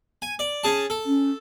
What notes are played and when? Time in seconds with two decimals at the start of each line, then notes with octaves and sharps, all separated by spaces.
0.22 G#5
0.39 D5
0.64 C#4 G#4 A5
0.90 A4
1.06 C#4